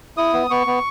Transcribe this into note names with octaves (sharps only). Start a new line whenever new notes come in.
E4 D#6
B3
B3 C#6
B3